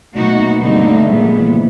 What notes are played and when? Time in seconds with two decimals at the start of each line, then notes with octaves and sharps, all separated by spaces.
0.15 B2 F#3 A3 A#3 D#4 F#4
0.39 B3
0.61 G2 D3 G3 A#3 C4 D#4
0.85 A3
1.08 A#2 G3 G#3 B3
1.23 F3
1.39 E3
1.54 D3